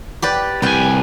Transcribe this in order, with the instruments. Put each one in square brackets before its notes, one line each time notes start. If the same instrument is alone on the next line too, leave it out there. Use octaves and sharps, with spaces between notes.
[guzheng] G4 B4 D5
[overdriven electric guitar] C2 G#5 [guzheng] B4 G5